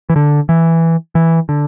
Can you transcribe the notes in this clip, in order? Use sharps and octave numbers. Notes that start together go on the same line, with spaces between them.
E3
D3
E3
E3
D3